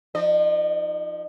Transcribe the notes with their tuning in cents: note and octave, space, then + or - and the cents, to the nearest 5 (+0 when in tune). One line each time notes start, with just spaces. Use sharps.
F3 -5 D#4 +0 D#5 -45